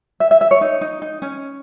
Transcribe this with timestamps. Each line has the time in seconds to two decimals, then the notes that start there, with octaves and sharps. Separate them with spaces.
0.20 E5
0.31 E5
0.41 E5
0.51 C#5
0.61 D#4
0.81 D#4
1.02 D#4
1.22 C#4